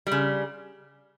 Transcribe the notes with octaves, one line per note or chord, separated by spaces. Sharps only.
G3
C#3